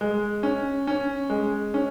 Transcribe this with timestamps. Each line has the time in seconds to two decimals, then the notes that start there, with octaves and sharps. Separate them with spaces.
0.01 G#3
0.43 C#4
0.87 C#4
1.30 G#3
1.74 C#4